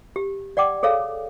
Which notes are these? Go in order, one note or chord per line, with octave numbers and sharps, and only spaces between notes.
G4
D5 F#5 G5 D6
G#4 A4 C#5 F5